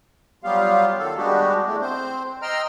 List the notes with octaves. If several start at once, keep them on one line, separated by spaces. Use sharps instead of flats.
F#3 G3 B3 F4 G4 F5
D#3 A4
G3 G#3 B3 D4 F#4 G4
E3 G#3 A3 D4
C4 C5
D#5 G5 A#5 C6 E6 F6